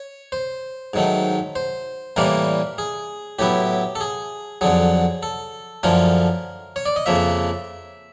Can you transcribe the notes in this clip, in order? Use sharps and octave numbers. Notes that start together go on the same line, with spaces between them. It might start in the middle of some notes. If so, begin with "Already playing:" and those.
Already playing: C#5
C5
G#2 D#3 F#3 A3
C5
A2 E3 G3 A#3 D4 A#4
G#4
A2 F#3 B3 E4 G4
A4
G#4
F2 D3 F#3 G#4
A4
F#2 D3 F3 A3 C#4 A#4
C#5
D5
D#5
F2 C#3 F3 A#3 E5